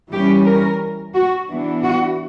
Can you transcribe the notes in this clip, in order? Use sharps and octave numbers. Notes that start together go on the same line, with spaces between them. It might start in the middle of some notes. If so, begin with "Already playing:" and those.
E3 G3 C#4 G4
A#4
F#4
E3 B3 D4
F#4